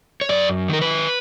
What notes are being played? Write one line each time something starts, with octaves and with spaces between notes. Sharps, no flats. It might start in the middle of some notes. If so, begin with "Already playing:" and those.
C#5
F#2 D5
D#3 A#4
B4